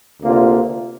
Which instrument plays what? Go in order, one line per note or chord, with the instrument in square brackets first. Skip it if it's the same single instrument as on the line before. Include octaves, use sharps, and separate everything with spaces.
[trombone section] D2 C3 A#3 F4